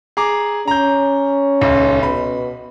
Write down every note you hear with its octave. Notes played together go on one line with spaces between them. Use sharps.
G#4 A#5 D6
C#4 A#5 G6
D#1 C#2
B2 B5